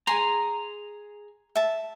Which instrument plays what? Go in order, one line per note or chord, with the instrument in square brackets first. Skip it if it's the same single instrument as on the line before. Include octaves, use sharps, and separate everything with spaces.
[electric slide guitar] G#4 G#5 A#5 [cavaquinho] C6
[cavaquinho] E5 A5